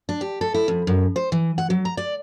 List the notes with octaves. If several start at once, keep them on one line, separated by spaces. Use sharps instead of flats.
D4
G4
A4
E4
F2
F#2
C5
E3
F#5
F#3
A#5
D5